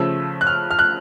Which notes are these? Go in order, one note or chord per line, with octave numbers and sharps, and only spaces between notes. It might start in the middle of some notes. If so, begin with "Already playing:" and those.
Already playing: C#3 F3 A3 E6
F#6
F6
F6
F#6